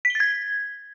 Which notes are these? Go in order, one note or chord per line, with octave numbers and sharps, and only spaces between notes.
B6
G7
A6
G#6